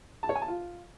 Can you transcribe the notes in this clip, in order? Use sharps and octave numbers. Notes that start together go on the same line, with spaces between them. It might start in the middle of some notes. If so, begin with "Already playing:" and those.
A5
C#5
G#5
A5
F4